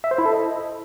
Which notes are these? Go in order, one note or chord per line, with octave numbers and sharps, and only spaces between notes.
E5
C5
E4
A4
D#5